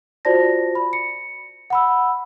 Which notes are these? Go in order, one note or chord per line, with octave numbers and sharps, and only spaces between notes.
F4 F#4 C5 D5 A5 A#6
B5
C#7
F#5 B5 E6